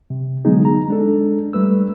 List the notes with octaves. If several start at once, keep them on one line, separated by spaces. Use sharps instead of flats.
C3
D3 F#3 G#3 B3 D#4 G#4
A#5
G#3 D4 A4
G3 A3 B4 E6